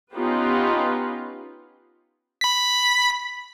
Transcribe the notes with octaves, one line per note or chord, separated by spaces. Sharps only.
B3 C#4 D#4 F4 G4 B4
B5 B6